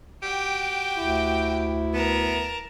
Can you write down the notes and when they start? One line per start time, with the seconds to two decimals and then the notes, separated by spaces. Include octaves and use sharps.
0.23 F#4 G4 G5
0.98 D2 E4
1.94 B3 A#4 A5